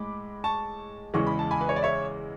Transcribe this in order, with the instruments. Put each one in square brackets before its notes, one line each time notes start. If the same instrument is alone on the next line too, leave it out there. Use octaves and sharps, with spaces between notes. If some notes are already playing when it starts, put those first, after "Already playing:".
Already playing: [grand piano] A2 G#3 B5 D6
A5 C#6
E2 C#3 E3 G#3 C#6
B5
A5
G#5 B5
B4
C#5
D5
C#5 E5